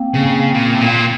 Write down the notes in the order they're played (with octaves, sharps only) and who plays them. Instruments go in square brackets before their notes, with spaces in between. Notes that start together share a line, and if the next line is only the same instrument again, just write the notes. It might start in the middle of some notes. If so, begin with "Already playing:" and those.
Already playing: [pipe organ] A#3 C4
[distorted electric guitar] C#3
A#2
A2
A#2